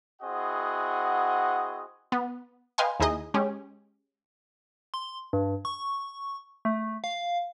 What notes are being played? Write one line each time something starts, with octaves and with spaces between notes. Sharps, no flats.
C4 E4 F#4 G#4 D#5 F#5
B3
B4 D#5 F5 G5 G#5 C6
D#2 D#4 E4 G#4 D#5
G#3 C#4 G4
C6
G2
C#6
A3
F5